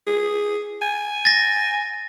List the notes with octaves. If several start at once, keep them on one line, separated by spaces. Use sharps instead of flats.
G#4
G#5
A6 A#6